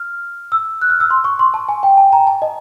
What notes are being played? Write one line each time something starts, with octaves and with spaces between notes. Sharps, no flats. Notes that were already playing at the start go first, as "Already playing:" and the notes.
Already playing: F6
E6
F#6
F6
E6
C6
C#6
C6
A5
G#5
G5
A5
A#5
A5
D#5